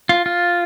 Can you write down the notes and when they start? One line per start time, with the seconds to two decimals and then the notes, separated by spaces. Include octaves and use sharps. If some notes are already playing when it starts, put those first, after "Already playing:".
0.09 F4
0.26 F4